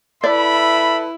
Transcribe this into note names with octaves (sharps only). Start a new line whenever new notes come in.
E4 A4 B4 D5 E5 B5